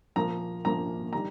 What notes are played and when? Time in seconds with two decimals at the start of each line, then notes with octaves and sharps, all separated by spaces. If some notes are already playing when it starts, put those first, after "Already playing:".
0.16 A#2 F3 A#3 A#5
0.65 A#2 F3 A#3 A#5
1.13 D#3 G3 A#5